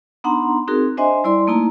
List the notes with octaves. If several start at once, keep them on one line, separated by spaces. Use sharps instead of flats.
B3 D4 D#4 F#5 A#5 C6
C4 D#4 F#4 G#4 A#4
D4 C5 D#5 E5 G#5 C6
G3 E4 D5 C6
A3 A#3 D#4 E4 A#5